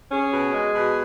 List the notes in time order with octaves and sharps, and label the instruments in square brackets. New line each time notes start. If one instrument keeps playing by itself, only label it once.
[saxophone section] C#4 G#4
B2
G#3
B2